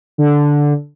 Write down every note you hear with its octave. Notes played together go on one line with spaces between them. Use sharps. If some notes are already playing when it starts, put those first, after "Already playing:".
D3